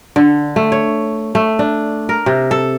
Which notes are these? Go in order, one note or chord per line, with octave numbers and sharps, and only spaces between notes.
D3
A3
C#5
A3
D4
A#4
C3
A4